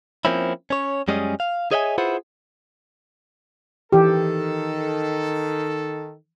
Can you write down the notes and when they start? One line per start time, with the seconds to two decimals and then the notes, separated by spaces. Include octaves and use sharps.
0.25 F3 A#3 C4 C#4 E4
0.70 C#4 C#5
1.08 F#2 G3 G#3 C#4 G#4 D#5
1.40 F5
1.71 G#4 C#5 D#5 E5 F#5 G#5
1.98 E4 F4 G#4 B4 C5 F#5
3.93 D#3 E3 G4 A4